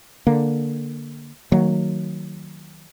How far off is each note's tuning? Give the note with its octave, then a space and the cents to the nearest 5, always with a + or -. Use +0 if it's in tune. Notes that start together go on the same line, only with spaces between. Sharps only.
D3 +0 A#3 +0
D#3 +0 F#3 +0 A#3 -45